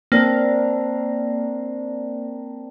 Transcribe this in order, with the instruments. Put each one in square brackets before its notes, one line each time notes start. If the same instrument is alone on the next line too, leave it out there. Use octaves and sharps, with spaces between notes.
[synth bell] A#3 [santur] C4 D4 A#4